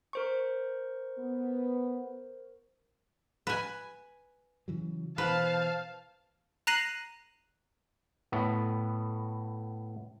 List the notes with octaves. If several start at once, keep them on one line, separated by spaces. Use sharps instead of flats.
A#4 C5 C#6
B3
B4 G#5
C#3 E3 F#3
B2 E3 B4 C5 F5 A5
A#5 F#6 A#6 C7 D#7 F#7
A2 B3